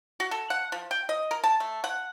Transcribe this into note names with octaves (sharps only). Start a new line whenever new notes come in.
F#4
A4
F#5
F3
G5
D#5
A#4
A5
A3
F#5